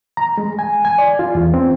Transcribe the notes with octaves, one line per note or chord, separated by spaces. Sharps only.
A#5
G#3
G#5
G#5
D5
F4
E2
C4